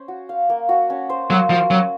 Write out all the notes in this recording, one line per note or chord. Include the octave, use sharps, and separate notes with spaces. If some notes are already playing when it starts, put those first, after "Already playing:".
Already playing: C#4 C5
F#4
F5
A#3
F#4
C#4
C5
F#3 A#3
F3 F#4
F#3 C#4